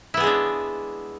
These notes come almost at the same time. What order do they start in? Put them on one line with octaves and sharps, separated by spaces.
E4 B3 G#4 G#3 D4